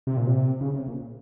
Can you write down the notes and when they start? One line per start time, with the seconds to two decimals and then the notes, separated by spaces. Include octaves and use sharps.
0.07 C3
0.17 A#2
0.27 C3
0.61 C#3
0.75 C3
0.88 A#2